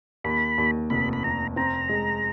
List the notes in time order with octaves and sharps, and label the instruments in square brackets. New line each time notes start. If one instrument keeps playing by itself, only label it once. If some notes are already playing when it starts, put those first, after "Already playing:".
[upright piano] D#2 [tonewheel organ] B5
[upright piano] D#2
[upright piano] F1 [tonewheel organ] B5
[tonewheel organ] B5
[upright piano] F1 [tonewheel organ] A#5
[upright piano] C4 [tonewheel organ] A#5
[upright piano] G#3